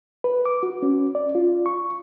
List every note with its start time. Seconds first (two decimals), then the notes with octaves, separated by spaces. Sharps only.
0.24 B4
0.46 D6
0.63 F#4
0.82 C#4
1.15 D5
1.35 F4
1.66 C#6